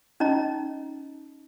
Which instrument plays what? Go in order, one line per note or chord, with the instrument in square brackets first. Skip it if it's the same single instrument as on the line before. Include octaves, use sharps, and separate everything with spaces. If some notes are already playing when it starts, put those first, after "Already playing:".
[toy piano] C#4 D#4 D#5 A#5